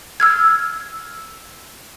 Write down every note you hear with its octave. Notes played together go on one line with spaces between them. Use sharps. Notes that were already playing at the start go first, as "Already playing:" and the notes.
E6 F6 G#6